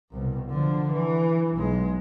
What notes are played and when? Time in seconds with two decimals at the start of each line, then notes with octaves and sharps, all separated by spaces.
0.11 C2 B2
0.49 D3 F3
0.91 E3
1.54 B1 G#3